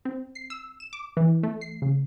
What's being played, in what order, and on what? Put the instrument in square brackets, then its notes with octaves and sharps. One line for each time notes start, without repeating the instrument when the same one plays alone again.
[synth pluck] C4
C7
E6
E7
D6
E3
A3
C7
C#3